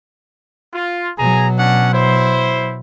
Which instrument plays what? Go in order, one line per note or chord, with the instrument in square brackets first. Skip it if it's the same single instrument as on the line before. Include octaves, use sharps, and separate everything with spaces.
[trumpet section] F4
[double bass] B2 F#3 [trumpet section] G#4 G#5 A#5
[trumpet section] C#4 D4 F#5
E4 C5